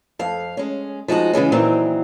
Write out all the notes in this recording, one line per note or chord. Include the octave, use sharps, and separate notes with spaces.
F2 F5
G#3 C#4
F3 G#3 D#4 F#4
C#3 E3 G#3 C#4
A#2 D#3 E3 F#3 C4